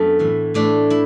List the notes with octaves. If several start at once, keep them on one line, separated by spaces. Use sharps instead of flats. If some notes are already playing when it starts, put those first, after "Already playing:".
Already playing: F#2 A3 B3 D4 E4
A2 E3
A2 E3 A3 D4
E4